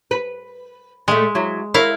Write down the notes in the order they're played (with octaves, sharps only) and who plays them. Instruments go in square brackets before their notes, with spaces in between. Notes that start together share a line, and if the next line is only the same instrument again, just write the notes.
[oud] B4
[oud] A#2 A3 [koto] G#3
[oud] F#3 E4
[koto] E4 F5 [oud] A#4 C#5 E5